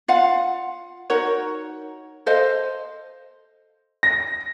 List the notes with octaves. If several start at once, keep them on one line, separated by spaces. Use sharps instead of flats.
F4 F5 F#5
D#4 F#4 A#4 C#5
A4 C5 D#5 F5
A#6